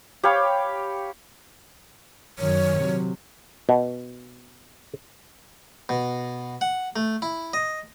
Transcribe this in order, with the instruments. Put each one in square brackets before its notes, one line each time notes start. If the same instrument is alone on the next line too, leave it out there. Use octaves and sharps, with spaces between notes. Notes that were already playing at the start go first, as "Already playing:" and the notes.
[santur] G4 C#5 F5 B5
[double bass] F#2 D#3 [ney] C#5
[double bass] C3 F#3
[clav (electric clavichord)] B2
[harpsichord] B2
F#5
A3
E4
D#5